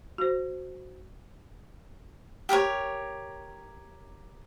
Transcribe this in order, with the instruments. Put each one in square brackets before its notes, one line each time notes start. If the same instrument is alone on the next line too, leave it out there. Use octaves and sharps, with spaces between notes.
[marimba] F#4 C5
[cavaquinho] G4 A#4 B4 C#5